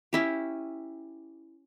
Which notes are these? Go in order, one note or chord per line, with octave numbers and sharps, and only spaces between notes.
C#4 E4 G4